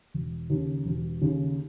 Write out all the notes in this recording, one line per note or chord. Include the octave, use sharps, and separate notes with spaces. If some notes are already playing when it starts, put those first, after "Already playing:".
E1
D#2 C#3
E1
D#2 C#3